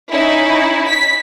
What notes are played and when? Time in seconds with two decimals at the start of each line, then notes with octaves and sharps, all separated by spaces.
0.12 C#4 D#4 E4
0.88 B6